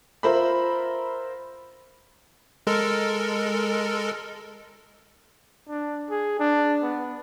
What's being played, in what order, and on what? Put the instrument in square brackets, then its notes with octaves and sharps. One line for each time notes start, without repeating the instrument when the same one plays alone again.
[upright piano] F4 A#4 C5 E5 B5
[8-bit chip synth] G#3 A4 A#4
[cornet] D4
G#4
D4
B3